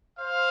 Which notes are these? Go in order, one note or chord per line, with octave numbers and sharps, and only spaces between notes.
C5 F5